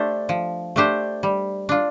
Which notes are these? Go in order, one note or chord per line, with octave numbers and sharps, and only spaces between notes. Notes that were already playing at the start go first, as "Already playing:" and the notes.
Already playing: A3 D4 G4 C5
F3
A3 D4 G4 C5
G3
D4 F4